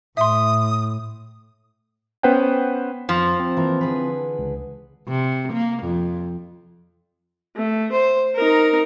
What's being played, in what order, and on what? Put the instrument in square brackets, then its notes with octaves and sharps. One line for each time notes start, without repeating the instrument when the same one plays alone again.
[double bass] A2 [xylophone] E5 C6 [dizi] D#6
[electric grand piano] B3 C#4 B4 C5 F#5 G5
[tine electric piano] F2 [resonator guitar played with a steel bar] F3
[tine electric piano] C4
[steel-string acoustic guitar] E3 A#3 A#4
D3 G#4 B4
[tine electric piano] C#2
[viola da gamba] C3
A#3
F2
[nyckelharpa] A3
C5
D#4 A#4